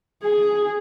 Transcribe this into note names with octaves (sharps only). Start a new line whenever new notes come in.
G#4